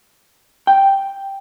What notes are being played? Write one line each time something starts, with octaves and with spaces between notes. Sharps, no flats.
G5